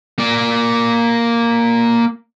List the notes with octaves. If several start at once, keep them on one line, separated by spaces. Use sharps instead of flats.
A#3 D5